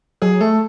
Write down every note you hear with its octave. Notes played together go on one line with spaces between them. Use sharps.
F#3 G#4
A3 A4